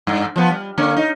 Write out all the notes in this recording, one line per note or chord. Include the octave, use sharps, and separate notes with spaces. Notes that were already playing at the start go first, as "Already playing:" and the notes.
G2
F3 B3
G3
D3 A#3 C#4
D#4